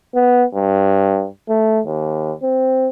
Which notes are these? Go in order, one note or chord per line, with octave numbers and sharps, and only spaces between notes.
B3
G2
A3
D#2
C4